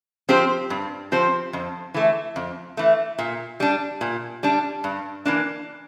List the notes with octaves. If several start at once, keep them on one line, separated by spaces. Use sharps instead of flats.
F3 C4 G4 C5
G2
F3 C4 G4 C5
F2
E3 A3
F2
E3 A3
A#2
G3 D4
A#2
G3 D4
G2
E3 A#3 D4